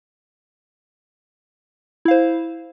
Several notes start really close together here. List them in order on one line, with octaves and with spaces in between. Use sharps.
E4 F5 C5